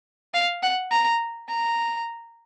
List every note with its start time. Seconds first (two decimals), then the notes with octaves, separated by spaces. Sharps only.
0.34 F5
0.63 F#5
0.91 A#5
1.48 A#5